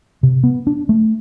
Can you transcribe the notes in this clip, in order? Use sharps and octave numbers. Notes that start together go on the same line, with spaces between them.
C3
B3
D4
A3